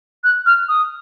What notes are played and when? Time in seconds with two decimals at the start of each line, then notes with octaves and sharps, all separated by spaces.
0.24 F#6
0.46 F6
0.69 D#6